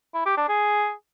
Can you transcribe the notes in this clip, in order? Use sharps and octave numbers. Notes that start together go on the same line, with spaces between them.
E4
G4
D4
G#4